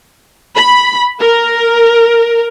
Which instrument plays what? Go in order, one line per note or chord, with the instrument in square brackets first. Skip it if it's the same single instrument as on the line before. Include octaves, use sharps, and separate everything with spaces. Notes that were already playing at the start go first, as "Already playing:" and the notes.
[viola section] B5
A#4